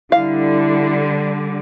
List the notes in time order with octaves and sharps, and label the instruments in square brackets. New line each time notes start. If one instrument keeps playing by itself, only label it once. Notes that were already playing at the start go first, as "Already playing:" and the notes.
[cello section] D3 G3 [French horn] E4 [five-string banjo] F5